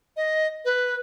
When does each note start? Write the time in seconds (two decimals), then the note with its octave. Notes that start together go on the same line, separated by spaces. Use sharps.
0.17 D#5
0.65 B4